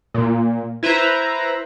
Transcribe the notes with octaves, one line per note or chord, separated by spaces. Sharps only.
A#2
E4 B4 C5 E5 A#5